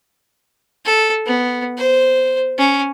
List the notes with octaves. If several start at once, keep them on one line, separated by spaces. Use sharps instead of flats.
A4
B3
C5
C#4